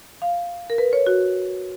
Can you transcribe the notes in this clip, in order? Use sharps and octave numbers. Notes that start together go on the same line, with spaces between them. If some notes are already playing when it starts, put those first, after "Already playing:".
F5
A#4
B4
C#5
F#4